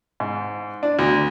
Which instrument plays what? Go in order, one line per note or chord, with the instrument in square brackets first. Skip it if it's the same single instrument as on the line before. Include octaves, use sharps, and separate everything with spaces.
[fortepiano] G#2
D4
D2